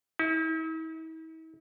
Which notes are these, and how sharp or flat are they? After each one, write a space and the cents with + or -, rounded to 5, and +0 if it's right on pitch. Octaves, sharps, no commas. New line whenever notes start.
E4 -45